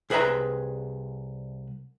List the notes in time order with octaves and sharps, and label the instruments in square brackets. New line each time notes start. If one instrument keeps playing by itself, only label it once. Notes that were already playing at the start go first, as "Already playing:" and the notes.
[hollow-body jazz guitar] C2 G#4 B4 E5 A#5